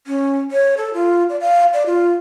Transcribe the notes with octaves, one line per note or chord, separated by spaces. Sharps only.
C#4
C#5
A4
F4
D5
F5
D5
F4